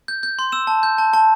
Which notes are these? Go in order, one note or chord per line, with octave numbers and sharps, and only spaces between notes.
G6
G6
C6
E6 E7
A5
G6
A5
A5